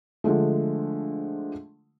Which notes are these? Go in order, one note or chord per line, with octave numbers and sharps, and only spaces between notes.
D3 F3 G#3 A3